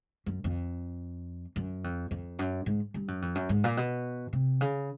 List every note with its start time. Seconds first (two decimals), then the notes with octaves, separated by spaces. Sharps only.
0.26 F#2
0.44 F2
1.56 F#2
1.84 F2
2.11 F2
2.39 F#2
2.66 G#2
2.94 G2
3.08 F#2
3.22 F2
3.35 F#2
3.49 G#2
3.64 A#2
3.77 B2
4.33 C3
4.61 C#3